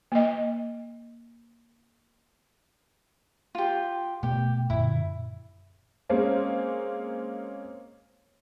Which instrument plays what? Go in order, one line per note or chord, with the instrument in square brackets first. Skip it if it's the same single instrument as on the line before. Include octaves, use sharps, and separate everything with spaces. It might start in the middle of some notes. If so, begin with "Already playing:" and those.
[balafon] A#3 D#5
[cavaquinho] F4 G4
[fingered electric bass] B2 A3 B3 [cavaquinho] G4
[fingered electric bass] F#2 A#2 D3 [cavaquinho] E4
[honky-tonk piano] G#3 A#3 C4 C#4